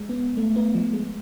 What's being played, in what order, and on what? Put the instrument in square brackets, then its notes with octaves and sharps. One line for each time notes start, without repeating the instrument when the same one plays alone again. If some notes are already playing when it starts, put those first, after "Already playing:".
Already playing: [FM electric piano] G#3
B3
A3
B3
F3
G#3